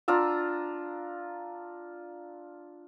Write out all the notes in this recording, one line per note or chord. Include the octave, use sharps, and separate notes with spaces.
D4 F4 A#5 E6